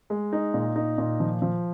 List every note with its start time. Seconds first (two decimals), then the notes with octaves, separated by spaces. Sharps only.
0.10 G#3
0.33 D#4
0.54 A#2
0.76 D#4
0.98 A#2
1.20 F3
1.42 F3